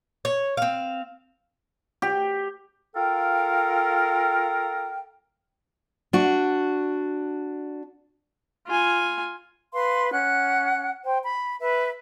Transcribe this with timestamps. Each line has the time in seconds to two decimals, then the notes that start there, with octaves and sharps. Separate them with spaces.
0.25 C#5
0.57 C4 F5
2.02 G4
2.96 F4 A4 A#4 F5 G5
6.13 D4 F#4
8.67 F4 G#5
9.73 B4 F5 C6
10.12 C#4 F#5 F#6
11.04 C5 G5
11.23 B5
11.59 B4 E5